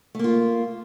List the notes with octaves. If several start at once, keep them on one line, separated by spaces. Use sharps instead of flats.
A3 A#3 F4